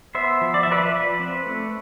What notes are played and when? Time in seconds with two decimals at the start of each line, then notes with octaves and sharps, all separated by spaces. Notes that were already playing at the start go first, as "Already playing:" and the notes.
0.15 B3 C5 E5
0.41 F3
0.54 D5
0.63 E5
0.67 F3 B4 D5
0.93 F3
1.20 C4
1.45 A3